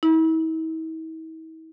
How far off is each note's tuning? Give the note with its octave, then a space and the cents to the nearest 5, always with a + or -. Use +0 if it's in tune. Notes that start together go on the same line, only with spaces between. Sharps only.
E4 -45